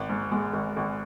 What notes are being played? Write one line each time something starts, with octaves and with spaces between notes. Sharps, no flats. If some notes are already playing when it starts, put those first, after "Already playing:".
Already playing: G#1
G#2
G#3
G#1
G#1